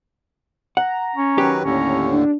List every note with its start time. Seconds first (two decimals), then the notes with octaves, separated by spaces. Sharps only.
0.77 F#5 A#5
1.16 C#4
1.38 D#3 F#3 G4 B4
1.64 D#2 A2 D3 C#4 A#5
2.11 D4